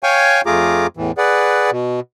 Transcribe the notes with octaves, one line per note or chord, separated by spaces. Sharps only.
C#5 F5 G5 G#5 C#6
F2 A3 F4 G#4 A#5 D6
E2 A2 E3
G#4 B4 D5 F#5
B2